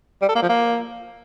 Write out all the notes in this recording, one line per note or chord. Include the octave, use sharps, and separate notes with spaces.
G3
A4
A#3
F3
A#3